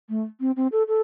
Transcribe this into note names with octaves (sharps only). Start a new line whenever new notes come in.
A3
C4
C4
A4
A4